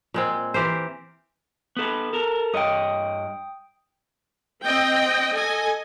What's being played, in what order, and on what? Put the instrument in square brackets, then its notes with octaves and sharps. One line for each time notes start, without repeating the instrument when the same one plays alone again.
[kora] A#2 G#3 C4
E3 G4 A#4 C5
[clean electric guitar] B3 A4 B4
A4 A#4
[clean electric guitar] G2 C#5 D#5 [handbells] G5 D#6
[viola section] C4 D#5 G5
A4 D#5 G#5